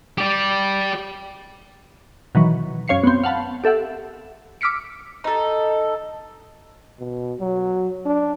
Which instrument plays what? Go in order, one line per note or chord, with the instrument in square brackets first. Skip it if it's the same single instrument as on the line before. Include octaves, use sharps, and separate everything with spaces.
[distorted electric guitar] G4 D5
[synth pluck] B2 D#3 E3 F#3
F#2 C#4 C#5 F5 C7 C#7
B3 C4
F5 F#5 A5 B5
G4 A4 E5 F#5
D6 E6 F6 B6 C#7 D7
[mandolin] D#4 A4
[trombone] B2
F#3
D4